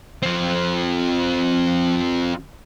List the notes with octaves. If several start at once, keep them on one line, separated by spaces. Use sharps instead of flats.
F3 C4